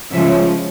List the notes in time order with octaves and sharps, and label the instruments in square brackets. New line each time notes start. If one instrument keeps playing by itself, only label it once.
[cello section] C#3 F3 G#3 C#4 E5